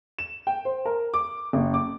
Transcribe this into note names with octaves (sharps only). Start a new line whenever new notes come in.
E7
G5
C5
A#4
D6
F#1
D6